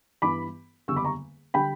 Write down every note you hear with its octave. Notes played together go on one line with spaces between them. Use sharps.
G2 E3 B3 B5 D6
F#1 E2 D3 G3 C#6 E6
B5 D6
A#5 C#6
D3 G3 G5 B5